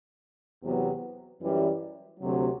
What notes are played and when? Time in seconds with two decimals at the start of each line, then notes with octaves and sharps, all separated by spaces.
0.62 E2 C3 F#3 B3
1.42 F#2 E3 G3
2.20 D2 C3 F#3